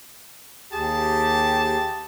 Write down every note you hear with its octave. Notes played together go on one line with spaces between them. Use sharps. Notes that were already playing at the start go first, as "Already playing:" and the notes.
D#2 G4 G#4 A5